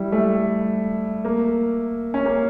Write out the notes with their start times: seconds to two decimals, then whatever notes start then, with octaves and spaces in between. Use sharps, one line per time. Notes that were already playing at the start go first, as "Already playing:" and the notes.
Already playing: G3 E4
0.12 A3
1.25 A#3
2.14 C#4
2.25 A#3